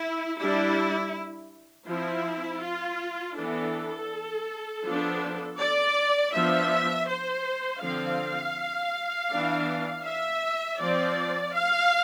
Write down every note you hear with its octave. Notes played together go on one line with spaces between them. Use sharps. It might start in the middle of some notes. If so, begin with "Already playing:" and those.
Already playing: E4
G3 D4 E4
F3 C4 E4
F4
E3 B3 D4 A4
F3 B3 D4
D5
F3 B3 D4 E5
C5
D3 F3 C4 F5
E3 B3 D4
E5
F3 C4 D5
F5